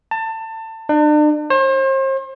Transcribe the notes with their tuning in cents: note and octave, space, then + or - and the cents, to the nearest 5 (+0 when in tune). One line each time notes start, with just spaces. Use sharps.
A5 +25
D4 +40
C5 +40